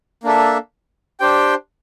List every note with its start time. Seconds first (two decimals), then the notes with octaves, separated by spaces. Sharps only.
0.23 A#3 D4 A4 E5
1.20 D4 G4 C5 G5